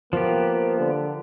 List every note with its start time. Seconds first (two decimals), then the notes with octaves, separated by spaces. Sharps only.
0.13 F3 A#3 B3 G4
0.79 D3